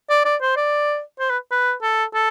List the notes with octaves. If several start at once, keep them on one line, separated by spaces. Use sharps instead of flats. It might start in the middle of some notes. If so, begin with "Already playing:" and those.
D5
D5
C5
D5
C5
B4
B4
A4
A4